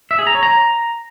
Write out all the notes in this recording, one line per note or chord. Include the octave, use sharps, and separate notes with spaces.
E5
G#4
A#5
C#5
A#5